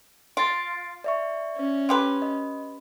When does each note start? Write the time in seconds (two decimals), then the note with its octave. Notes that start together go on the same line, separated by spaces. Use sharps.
0.37 F4 A6 C7 D7
1.04 D5 E5 C#6
1.57 C#4
1.89 F4 G4 B4
2.22 D#5